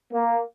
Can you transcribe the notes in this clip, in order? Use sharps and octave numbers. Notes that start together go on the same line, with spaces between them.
A#3